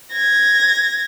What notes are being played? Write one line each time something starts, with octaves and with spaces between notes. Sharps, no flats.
G#6 A#6